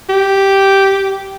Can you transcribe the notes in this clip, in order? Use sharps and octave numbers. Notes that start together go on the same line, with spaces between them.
G4